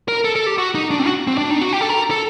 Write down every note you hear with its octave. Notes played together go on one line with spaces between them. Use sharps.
A#4
A4
A4
G4
F#4
D#4
D4
C4
F#4
C4
D4
D#4
F#4
G4
A4
A#4
A4